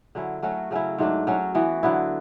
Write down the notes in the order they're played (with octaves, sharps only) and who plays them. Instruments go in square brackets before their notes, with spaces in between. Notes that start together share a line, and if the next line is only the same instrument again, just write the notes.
[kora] D3 F#3 C#4 E4
F#3 A3 C#4 F#4
C#3 F#3 C#4 E4
G#2 F#3 A3 D4
F#3 C#4 F#4
E3 B3 F#4
D3 F#3 B3 E4